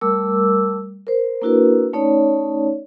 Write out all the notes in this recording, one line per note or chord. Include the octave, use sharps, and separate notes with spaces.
G3 A3 A#4 D6 E6
A#4 C5
A#3 D4 E4 F#4 A#4 B4
A3 C#4 D#4 C#5 D5